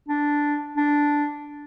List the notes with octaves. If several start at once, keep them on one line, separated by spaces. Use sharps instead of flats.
D4
D4